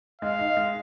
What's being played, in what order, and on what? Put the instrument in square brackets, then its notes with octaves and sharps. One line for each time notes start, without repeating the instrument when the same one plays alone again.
[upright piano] G#3 [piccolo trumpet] F5
[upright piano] D#4
G#3